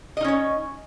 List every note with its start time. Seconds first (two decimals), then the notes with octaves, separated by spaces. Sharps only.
0.17 D#5
0.21 D#4
0.24 C#4
0.28 C#5